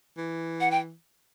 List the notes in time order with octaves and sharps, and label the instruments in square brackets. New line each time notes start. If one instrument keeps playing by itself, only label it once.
[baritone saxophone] E3
[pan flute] F#5
G5